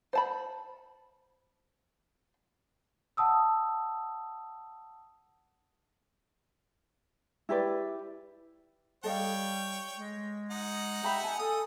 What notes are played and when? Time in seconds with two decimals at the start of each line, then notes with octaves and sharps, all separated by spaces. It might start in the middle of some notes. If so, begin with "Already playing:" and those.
0.13 C5 A5 B5
3.17 F#5 A5 D#6 E6
7.49 E4 G4 B4 D5
9.04 G3 A4 C#5 D#5 F5 G5
9.98 G#3
10.51 D#4 F#5
11.03 G4 E5 A#5 B5
11.23 G#5 A5
11.39 A4 G#5 D#6